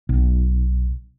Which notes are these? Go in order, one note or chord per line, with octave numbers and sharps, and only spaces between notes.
B1